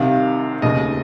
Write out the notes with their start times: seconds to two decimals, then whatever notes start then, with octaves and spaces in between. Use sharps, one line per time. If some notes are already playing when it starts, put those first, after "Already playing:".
Already playing: C2 C3 D#3 F5
0.62 F1 D#2 C#3 D#5